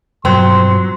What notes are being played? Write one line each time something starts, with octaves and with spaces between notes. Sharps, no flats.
G2 B2 F3 F#3 C4 C6